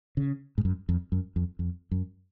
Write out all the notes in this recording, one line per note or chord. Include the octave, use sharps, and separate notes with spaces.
C#3
G#2
F#2
F2
F#2
F2
F2
F#2